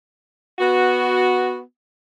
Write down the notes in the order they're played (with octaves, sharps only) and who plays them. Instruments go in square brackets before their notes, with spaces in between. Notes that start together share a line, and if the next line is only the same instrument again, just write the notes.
[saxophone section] B3 F#4